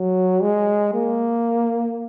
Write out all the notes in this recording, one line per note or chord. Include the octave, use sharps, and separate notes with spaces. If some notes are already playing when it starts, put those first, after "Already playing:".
Already playing: F#3
G#3
A#3